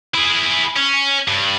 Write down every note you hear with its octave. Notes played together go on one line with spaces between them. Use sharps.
E4 G#4
C#4
G2